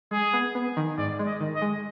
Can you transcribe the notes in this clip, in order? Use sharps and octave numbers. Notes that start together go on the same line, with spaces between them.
G#3 G#4
B3
B3
D#3
G#2 D5
G#3
D#5
D#3
D#5
G#3